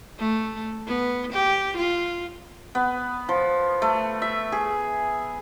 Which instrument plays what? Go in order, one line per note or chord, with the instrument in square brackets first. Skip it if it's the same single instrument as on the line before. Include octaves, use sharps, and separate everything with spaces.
[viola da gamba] A3
B3
G4
F4
[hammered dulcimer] B3
F3
A3
E5
G#4